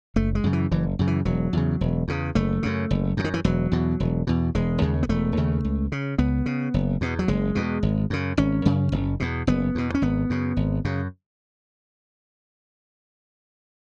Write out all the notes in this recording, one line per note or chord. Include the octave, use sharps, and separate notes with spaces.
F#1 A3
G#3
F#2 C#3
E3
F#1 E3
F#2 C#3
E3
E1 F#3
E2 C#3
E1
E2 C#3
F#1 A3
F#2 C#3
F#1
F#2 C#3
D#3
E3
E1 F#3
E2 B2
E1
E2 B2
E1 G#3
D#2 C#3
B3
E1 A3
D#2 C#3
C#2
C#3
C#2 B3
C#3
F#1
E2 B2
F#3
F#1 G#3
E2 B2
G#1
F#2 C#3
G#1 C#4
F#2 C#3
F#1
E2 B2
F#1 B3
E2 B2
C#4
G#1 B3
F#2 C#3
G#1
F#2 C#3